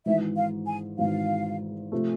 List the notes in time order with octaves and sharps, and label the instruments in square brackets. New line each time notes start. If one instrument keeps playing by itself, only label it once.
[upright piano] G#1 G#2 E3 [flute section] E5
[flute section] F5
G#5
[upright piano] G#1 G#2 E3 [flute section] F5
[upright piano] C3 F3 A3